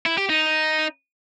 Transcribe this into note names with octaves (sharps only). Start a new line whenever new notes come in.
E4
G4
D#4